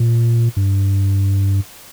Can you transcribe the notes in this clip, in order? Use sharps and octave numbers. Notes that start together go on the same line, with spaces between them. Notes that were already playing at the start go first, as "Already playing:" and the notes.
Already playing: A#2
G2